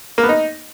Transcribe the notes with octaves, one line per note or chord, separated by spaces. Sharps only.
A#3
B3
D#4